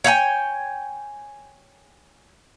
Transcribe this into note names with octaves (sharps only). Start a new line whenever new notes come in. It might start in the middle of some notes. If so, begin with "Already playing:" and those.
C#5 F5 G5 G#5